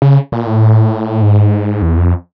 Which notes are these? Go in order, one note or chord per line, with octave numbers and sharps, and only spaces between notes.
C#3
A#2
A2
G#2
E2
F2